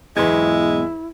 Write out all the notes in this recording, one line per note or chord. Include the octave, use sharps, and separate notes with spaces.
B1 E2 G#2 G#3 E4 B4 C6 G#6